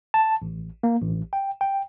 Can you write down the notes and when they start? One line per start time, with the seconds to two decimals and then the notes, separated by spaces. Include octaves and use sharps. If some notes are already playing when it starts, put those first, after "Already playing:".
0.14 A5
0.42 A1
0.83 A#3
1.01 A1
1.33 G5
1.61 G5